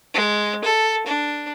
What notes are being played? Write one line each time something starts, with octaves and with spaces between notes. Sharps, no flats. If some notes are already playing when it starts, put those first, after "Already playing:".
G#3
A4
D4